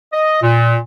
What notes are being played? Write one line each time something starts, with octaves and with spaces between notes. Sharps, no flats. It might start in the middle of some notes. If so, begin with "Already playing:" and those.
D#5
A#2